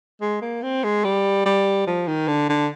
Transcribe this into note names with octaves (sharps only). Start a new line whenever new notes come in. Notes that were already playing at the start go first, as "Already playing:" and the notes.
G#3
A#3
C4
G#3
G3
G3
F3
D#3
D3
D3